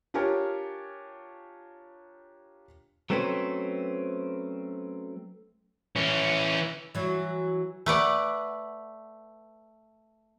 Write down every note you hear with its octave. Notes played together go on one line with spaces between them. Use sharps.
D4 F4 G4 A#4 C#5 G#5
F#3 A3 C4 C#4 B4 C5
E3 C#4
E3 F#3
A3 B4 D5 F#5